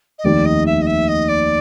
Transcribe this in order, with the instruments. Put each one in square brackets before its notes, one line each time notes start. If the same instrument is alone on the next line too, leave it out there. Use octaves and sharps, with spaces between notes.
[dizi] D#5
[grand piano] F1 D#2 D#3 [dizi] D5
[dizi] D#5
E5
D#5
E5
D#5
D5